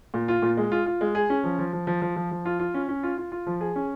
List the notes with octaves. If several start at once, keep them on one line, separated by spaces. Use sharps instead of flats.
A#2
F4
A#2
G#3
F4
F4
G#3
G#4
C#4
F3
F3
F3
F3
F3
F3
F3
F4
F4
C#4
C#4
F4
F4
F4
F3
G#4
C#4